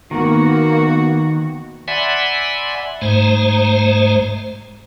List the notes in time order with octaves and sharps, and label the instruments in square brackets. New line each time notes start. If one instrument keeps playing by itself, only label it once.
[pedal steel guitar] D#3 [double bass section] A#3 B3 [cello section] F#4
[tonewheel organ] D5 E5 F#5 G#5 B5 C6
G#2 G#3 A3 C5 A#5